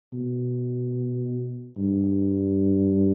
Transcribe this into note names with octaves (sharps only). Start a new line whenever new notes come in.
B2
G2